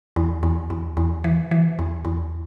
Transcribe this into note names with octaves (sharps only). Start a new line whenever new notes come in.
E2
E2
E2
E2
E3
E3
E2
E2